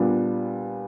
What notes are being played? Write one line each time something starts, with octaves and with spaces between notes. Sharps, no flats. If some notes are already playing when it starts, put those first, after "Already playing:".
Already playing: A#2 G3 B3 D4